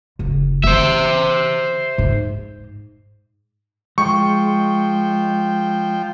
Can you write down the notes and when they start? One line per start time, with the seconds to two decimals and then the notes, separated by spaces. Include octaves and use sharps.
0.19 F#1
0.64 D3 E3 C5 E5
1.98 G#2
3.98 F3 G#3 G5 C#6